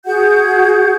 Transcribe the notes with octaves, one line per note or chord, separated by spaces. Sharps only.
F#4 G#4 F#5 G6